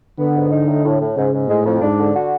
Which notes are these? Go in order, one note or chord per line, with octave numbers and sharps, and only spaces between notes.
D3 B3
G#2
D#4
A2
A2
A2
G#2 C#3
G#2
A2 G#3
F2
G#2 D4
D3
F#4